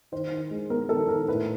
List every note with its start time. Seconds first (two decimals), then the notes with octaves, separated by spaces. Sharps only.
0.12 D#3 C5
0.31 D#3
0.51 G#3
0.70 B3 A#4
0.89 D#3 A4
1.09 D#3 A#4
1.28 A2 B4